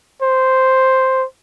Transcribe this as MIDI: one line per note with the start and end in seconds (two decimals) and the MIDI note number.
0.22 1.25 72